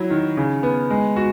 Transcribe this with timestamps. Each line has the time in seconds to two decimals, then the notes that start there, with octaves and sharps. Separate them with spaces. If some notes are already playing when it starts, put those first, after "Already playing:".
Already playing: F#3 E4
0.10 D#3
0.37 C#3
0.63 B3
0.90 G#3
1.16 F#4